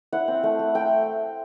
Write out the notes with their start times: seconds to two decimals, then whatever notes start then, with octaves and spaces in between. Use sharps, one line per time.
0.12 E4 F#5
0.28 C4
0.43 A3
0.59 A3
0.75 A3 G5